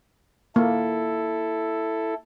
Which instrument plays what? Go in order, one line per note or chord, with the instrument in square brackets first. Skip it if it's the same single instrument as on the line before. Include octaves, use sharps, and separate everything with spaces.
[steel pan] A#3 [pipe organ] E4 A4